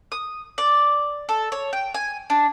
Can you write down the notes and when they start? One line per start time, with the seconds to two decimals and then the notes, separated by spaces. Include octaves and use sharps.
0.12 D#6
0.58 D5
1.29 A4
1.52 C#5
1.73 G5
1.94 G#5
2.30 D4